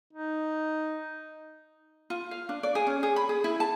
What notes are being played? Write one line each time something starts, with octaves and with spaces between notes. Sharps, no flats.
D#4
F4
F5
D4
D5
G#4
C#4
G#4
B5
G#4
E4
A5